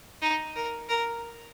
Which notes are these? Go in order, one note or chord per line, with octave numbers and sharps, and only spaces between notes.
D#4
A#4
A#4